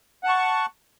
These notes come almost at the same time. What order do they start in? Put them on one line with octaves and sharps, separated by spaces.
F#5 A5 C#6